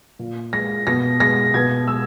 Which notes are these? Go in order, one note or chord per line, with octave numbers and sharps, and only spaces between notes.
A#2
G#3 A#6
B2 A#6
G#3 A#6
B2 G#6
G#3 E6